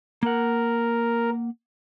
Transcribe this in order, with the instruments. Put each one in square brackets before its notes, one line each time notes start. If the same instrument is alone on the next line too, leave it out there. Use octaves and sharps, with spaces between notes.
[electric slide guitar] A#3 F#5 [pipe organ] A#4